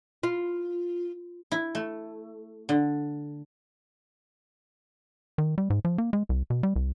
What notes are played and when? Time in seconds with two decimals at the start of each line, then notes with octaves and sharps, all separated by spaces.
0.23 F4
1.52 E4
1.75 A3
2.69 D3
5.38 D#3
5.58 G3
5.70 G#2
5.85 F3
5.98 A#3
6.13 G#3
6.29 C2
6.50 B2
6.63 G3
6.76 C2